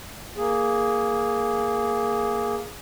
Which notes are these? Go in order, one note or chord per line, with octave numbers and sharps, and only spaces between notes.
A#3 G#4